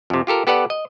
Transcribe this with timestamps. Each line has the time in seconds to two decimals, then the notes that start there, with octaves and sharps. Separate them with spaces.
0.10 F2 C3
0.27 F4 G4 A4 A#4
0.47 B3 G4 A4 B4 D5 F#5
0.70 D#5